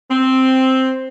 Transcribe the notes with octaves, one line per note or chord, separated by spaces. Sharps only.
C4